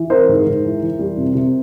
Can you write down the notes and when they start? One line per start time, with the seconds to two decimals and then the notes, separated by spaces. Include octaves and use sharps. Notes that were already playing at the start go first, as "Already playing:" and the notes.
Already playing: E3
0.10 C4 A#4 C5
0.29 G#2
0.47 G#2
0.65 E3
0.82 E3
0.99 G3
1.18 C3
1.35 C3